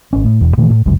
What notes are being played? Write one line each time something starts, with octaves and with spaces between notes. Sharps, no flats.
G#1 C#4
A2
E1 E2
A#2 D#3 E3 A3
A2
G1 C#2 F#2